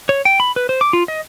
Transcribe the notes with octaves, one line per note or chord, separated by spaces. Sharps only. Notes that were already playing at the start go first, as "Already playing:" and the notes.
C#5
G5
B5
B4
C5
D6
F4
D#5